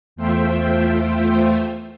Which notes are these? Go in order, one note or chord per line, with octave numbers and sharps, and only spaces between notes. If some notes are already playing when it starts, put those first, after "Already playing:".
E2 A3 F4 C5 E5 G5